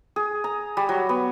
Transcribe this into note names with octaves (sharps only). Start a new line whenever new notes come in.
G#4
A#5
G3
F#3
B3